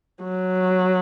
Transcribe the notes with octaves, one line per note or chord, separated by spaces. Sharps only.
F#3